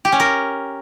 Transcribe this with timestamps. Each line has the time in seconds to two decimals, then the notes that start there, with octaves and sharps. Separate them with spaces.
0.05 G4
0.12 C#4
0.20 A#4